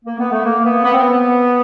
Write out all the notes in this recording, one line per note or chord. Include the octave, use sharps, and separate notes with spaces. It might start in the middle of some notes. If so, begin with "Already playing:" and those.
A#3
B3
A3
A#3
B3
B3
C4
B3